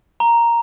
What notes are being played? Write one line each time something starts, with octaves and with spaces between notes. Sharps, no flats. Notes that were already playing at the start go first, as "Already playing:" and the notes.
A#5